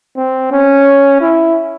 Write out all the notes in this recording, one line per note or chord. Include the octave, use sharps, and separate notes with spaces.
C4
C#4
E4